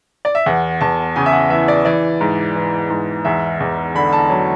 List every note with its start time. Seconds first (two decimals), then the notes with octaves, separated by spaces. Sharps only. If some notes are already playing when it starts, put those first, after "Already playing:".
0.25 D5
0.35 E5
0.46 E2 F#5
0.81 E2 A5
1.16 C#3 G#5
1.26 E5
1.32 F#5
1.50 E3 E5
1.68 D5
1.85 E3 D5
2.21 G#2
2.56 E3
2.90 G#2
3.25 E2 E5
3.60 E2
3.95 D3 B5
4.13 A5
4.29 F#3 C#5